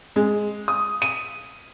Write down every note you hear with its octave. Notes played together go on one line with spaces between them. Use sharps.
G#3
D#6
D#7